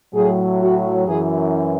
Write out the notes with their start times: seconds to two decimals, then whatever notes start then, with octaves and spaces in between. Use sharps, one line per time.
0.14 A2 F#3 G#4
0.61 F#4
1.06 F#2 E3 G#4